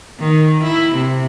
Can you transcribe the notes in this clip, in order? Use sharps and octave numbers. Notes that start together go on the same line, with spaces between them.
D#3
E4
C3